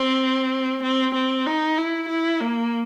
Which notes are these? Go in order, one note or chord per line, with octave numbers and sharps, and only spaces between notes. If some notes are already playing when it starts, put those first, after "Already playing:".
Already playing: C4
C4
C4
D#4
E4
E4
A#3